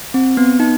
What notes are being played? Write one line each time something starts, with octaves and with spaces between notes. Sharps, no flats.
C4
B3
D#4